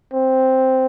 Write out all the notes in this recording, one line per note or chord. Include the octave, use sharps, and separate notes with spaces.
C4